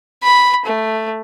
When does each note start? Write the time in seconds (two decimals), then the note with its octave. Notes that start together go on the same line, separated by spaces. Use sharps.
0.23 B5
0.66 A3